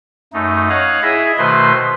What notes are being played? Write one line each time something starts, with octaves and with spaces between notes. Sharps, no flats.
F#2 A3 D#4
C#5 D#5 F5 F#5
E4 G#4 D#5 E5
B2 D#3 A3 B4 C5 C6